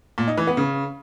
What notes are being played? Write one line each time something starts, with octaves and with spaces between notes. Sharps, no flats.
A#2
D#4
E3
B3
C#3